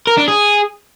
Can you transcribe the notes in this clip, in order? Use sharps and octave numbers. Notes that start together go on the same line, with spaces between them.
A#4
D4
G#4